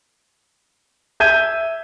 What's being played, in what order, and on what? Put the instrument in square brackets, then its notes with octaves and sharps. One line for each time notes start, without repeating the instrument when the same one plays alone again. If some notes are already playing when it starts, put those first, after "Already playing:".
[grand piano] E5 G6 G#6 D#7